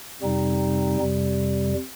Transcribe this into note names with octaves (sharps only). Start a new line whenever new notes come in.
F2 C3 G3 C4 D#4
F2 C3 G3